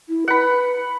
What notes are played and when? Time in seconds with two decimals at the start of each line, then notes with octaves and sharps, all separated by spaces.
0.09 E4
0.28 B4 F#5 B5